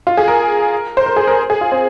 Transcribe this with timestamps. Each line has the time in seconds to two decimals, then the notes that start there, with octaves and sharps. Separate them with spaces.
0.07 F4
0.17 G#4
0.28 A#4
0.97 C5
1.06 A#4
1.16 G#4
1.27 A#4
1.50 G#4
1.61 F4
1.72 C4